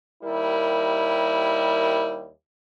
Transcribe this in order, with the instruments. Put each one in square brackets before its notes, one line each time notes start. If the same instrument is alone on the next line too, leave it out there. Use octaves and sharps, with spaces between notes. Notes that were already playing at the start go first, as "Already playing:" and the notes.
[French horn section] D#2 G3 E4 A#4